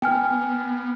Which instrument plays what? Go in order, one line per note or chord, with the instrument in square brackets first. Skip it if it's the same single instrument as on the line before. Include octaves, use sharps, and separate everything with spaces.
[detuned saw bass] B3 [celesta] G5 G#5 F6